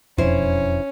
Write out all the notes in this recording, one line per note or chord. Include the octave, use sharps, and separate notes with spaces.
E1 F2 C#4 D4 E4 C5